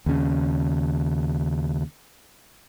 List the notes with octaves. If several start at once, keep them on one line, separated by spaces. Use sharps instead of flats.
D#2 C#3